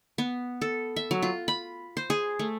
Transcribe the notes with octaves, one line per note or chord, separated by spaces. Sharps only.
B3
A4
E5
F#3
F4
B5
C5
G#4
A3